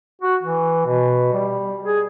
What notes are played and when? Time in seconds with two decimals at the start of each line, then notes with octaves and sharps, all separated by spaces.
0.21 F#4
0.43 E3
0.86 B2
1.33 G3
1.84 G#4